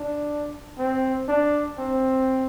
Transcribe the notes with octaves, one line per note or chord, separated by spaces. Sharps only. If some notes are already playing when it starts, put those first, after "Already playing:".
Already playing: D4
C4
D4
C4